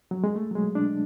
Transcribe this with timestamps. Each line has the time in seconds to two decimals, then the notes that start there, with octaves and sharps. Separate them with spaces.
0.11 F#3
0.24 G#3
0.36 A3
0.51 F#3
0.55 G#3
0.75 D4